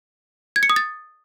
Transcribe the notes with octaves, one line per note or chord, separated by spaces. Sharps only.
G#6
C#7
D#6
A6